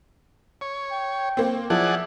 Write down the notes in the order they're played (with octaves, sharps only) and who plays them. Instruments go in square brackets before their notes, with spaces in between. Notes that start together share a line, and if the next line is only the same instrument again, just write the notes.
[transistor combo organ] C#5
[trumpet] G5
[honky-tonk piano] A#3 C4
[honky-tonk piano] F3 [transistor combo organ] G#4 D5 F#5 [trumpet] E5